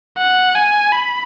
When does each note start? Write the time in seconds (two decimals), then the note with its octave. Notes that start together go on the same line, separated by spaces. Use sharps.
0.18 F#5
0.55 G#5
0.92 B5